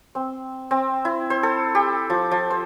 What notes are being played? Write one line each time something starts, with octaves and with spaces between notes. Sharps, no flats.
C4
C4
E4
C5
A4
G4
F3
F3
C5